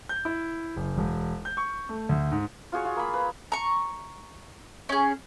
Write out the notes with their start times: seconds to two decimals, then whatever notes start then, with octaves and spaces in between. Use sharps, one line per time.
0.09 G6
0.25 E4
0.76 F#1
0.97 E1
1.45 G6
1.57 C#6
1.89 A3
2.09 D2
2.32 G#2
2.72 F4 F#4 G#4 C#5
2.85 F4 G#4
2.97 A#3 B5
3.14 B4 A#5
3.52 A#5 C#6
4.89 C#4 G#4